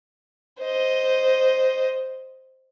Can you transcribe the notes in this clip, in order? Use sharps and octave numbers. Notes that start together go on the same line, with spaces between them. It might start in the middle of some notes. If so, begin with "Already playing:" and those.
C5 D#5